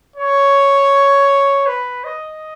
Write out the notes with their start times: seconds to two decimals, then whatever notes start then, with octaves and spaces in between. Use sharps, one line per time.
0.16 C#5
1.66 B4
2.04 D#5